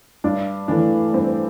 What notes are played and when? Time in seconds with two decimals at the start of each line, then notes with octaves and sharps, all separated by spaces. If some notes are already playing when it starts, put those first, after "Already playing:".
0.24 G2 D4
0.68 E3 A3 D4
1.13 G2 C4